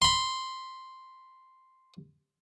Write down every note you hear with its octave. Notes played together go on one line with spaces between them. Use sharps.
B5 C6